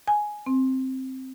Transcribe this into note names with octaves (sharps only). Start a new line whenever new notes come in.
G#5
C4